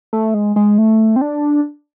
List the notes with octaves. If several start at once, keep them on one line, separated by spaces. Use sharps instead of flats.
A3
G#3
G#3
A3
C4
D4